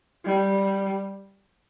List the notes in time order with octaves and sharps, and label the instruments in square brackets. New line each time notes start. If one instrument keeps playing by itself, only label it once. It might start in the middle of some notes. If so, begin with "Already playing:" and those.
[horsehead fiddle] G3